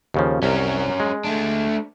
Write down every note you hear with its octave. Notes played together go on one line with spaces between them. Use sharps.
D#2 C#3 F3
C2 C#4 A#4
G#3
A3 D4